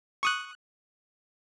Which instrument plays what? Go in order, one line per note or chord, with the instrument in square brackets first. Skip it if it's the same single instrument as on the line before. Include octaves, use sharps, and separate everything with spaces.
[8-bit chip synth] C#6 D#6 F#6